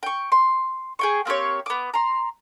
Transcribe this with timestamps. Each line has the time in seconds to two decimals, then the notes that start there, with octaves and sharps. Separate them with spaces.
0.03 G5 C#6
0.32 C6
0.99 G#4 G5 C#6
1.25 A#3 C4 G4 C#5
1.66 B3 D6
1.94 A#5 C6